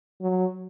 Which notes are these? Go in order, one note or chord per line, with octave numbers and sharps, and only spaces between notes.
F#3